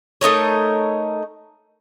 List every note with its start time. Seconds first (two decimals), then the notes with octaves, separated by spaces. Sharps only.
0.21 A3 D#4 A#4 C#5